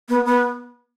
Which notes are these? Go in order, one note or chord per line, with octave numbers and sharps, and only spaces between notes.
B3
B3